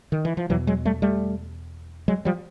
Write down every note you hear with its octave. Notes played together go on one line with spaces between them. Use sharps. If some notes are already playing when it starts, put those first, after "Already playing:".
D#3
E3
F3
E2 B2 E3 F#3
F#3 G#3
G3 A3
G3 A3
F#3 G#3
F3 G3